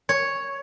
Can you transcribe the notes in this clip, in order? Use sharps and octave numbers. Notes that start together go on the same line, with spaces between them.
C#5